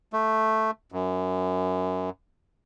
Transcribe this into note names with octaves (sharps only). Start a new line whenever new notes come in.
A3
F#2